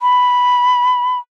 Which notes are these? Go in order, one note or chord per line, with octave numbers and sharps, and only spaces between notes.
B5